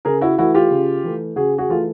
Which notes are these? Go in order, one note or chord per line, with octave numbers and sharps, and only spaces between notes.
C#3 G#4 A#4
E4 F#4
E3 A3 E4 F#4
F4 G4
C#3
E3 A3
C#3 F#4 G#4
F#4 G#4
E3 A3 F4